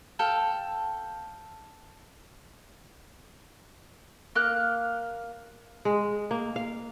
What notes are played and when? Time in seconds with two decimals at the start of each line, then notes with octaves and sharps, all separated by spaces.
0.19 A4 F5 G5
4.36 A#3 F5 F#6
5.85 G#3
6.31 A#3
6.56 F5